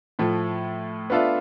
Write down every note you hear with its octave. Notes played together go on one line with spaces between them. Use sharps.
A2 F3 A3
B3 D4 F4 A4 E5